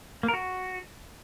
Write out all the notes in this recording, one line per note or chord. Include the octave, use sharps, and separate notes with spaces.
A#3
A#4
F#4